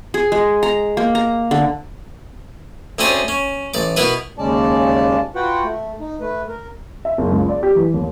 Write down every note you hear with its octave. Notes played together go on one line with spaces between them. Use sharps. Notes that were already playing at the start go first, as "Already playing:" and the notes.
G#4
G#3
A#5
A#3
A#5
D3
D2 C4 C#4 G#4 A5
C#4
A1 D5 D6
B2 E4 A#4 B4
D#2 C#3 G#3 C#4 D5 A5
F4 F#4 B4 F#5 G5
A3
D#4
A3 B4
A#4
E5
F#1
C#2
D5
G4
E3
D#2